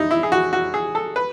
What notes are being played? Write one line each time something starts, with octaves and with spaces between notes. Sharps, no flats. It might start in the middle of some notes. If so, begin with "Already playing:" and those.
Already playing: D#4 E4
E4
G#4
F#4
F#4
G#4
A4
B4